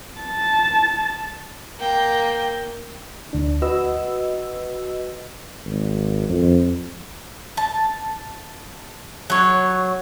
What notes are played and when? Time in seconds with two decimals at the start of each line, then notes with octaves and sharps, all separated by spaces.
0.21 A5
1.79 A#3 G5
3.33 D2 D4
3.62 F#4 B4 D#5 E6
5.66 G#1
6.29 F2
7.57 A5
9.30 F#3 C#5